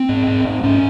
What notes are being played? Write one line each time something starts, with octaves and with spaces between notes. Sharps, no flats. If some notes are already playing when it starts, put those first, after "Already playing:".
Already playing: C4
G#2
G#2
G#2
G#2 C#4